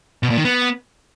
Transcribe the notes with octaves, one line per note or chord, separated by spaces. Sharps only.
B2
A#2
D#3
B3